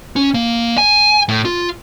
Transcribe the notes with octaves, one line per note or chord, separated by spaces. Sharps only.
C#4
A#3
G#5
A2
F4